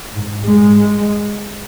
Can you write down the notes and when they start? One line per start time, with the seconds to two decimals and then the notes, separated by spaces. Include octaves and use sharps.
0.11 G#2
0.44 G#2 G#3